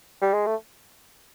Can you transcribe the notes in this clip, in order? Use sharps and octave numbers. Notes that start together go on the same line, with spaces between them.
G3
G#3
A3